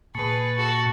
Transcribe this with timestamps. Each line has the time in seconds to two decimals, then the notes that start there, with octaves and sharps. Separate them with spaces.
0.15 A#2 G#4 B4 A5 C#6
0.57 F#4 A4